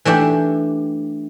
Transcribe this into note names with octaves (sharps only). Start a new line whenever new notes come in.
E3 A3 D4 G4